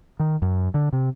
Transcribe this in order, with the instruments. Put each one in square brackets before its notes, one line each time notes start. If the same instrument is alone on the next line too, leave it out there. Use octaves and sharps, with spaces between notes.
[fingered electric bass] D#3
F#2
D3
C3